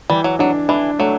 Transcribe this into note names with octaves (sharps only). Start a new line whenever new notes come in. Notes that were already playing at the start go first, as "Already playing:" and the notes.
E3 G3
F#3
F#3 D4
E3 D4
F#3 A3